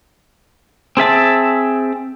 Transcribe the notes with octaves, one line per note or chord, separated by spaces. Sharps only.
C4 G#4 E5 A5